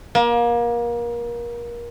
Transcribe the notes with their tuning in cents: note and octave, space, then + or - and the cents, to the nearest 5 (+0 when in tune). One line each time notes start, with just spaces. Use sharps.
A#3 +30